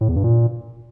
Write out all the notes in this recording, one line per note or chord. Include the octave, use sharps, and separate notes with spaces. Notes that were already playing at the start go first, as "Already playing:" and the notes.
A2
E2
G2
A#2